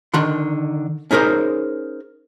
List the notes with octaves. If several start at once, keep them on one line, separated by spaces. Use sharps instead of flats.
D3 D#3 F#5 C6
C#4 D#4 G#4 A#4 C5